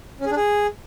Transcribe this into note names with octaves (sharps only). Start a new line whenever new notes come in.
C#4
G#4
D4
G#4